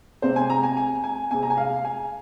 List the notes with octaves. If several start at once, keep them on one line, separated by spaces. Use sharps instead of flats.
C3 G#3 C4 C5
G#5
A#5
G#5
G#5
G#5
C3 G#3 C4 G#5
A#5
G#5
F5
G#5